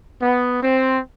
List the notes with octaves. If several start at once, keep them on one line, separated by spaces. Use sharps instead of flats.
B3
C4